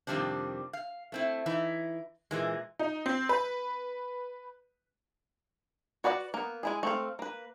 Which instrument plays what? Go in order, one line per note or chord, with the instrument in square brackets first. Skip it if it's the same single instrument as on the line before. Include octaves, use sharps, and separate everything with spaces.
[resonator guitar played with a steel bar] F2 C3 D#3 G3 C4 D4
F5
A3 C4 E4
E3 D#4 E4
A#2 E3 G#3
[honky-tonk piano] D#4
C4
B4
[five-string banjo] F#4 B4 D5 E5 F#5
A#3 B3
G#3 E4 G#4
A3 C4 F5
A#3 B4